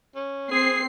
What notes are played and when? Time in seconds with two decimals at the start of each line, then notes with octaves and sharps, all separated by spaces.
0.15 C#4
0.51 C4 G#4 C7